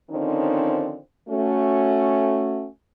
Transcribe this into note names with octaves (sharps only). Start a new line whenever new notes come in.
D3 D#3 F3 C4 C#4 D#4
A3 C#4 F#4